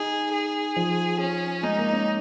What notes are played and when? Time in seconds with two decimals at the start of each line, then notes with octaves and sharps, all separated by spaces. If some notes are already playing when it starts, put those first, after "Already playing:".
Already playing: D#4 G#4
0.33 G#4
0.76 F3
1.20 C#4
1.63 G#3 D#4
1.78 A#3
1.93 C#4